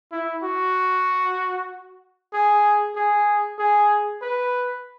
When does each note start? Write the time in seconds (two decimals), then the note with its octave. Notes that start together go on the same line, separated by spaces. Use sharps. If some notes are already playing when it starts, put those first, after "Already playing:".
0.12 E4
0.43 F#4
2.33 G#4
2.95 G#4
3.59 G#4
4.21 B4